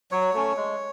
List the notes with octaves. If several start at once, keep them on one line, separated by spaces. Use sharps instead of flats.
F#3 C#5
A3 C#4
G#3